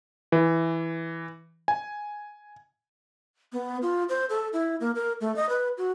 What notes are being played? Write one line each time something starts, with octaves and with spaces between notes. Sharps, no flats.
E3
G#5
B3
F4
C5
A4
E4
A#3
A#4
A3
D#5
B4
F#4